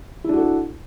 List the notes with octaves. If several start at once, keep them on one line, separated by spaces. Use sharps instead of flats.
D4 E4 F#4 A4